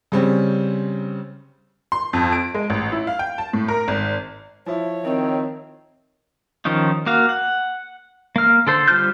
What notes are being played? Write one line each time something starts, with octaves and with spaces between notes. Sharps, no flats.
C#3 G3 C4 C#4
C6
F2
D7
G#3
A1
E4
F5
G5
A5
A2
A#4
G#1
F3 E4 C#5
D#3 C4
D#3 F3 C#4 D#4
A#3 F#4 F5
F#5
A#3 F6
D3 A4 C5
G3 F4 C5 F6 G6